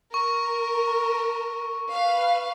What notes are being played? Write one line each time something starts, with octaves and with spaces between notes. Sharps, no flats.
A#4 C#6
B4 F5